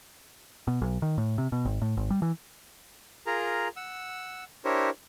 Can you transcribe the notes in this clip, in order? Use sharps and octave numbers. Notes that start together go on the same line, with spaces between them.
B2
B1
D#3
A2
C3
B2
G#1
A2
G#1
G3
E3
F4 G#4 A#4 A#5
F#5 E6
D4 E4 G4 A#4 C5 C#5